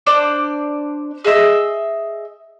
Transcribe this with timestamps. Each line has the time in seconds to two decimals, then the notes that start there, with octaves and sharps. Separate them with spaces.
0.06 D4 C5 D5
1.25 G#4 D#5 E5 E6